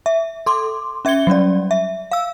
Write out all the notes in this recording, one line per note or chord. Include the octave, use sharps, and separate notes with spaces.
E5
A4 C6 D6
C#4 E5 G#6 C#7 G7
F#3 G3 C#4 D5
E5
F5 E6